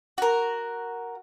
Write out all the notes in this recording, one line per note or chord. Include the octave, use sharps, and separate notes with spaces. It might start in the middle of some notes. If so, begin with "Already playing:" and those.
F#4 A#4